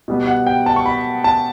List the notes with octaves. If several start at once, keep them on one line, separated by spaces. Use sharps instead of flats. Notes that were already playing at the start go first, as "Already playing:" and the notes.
B2 G3 B3
F#5
G5
A5
C#6
B5
A5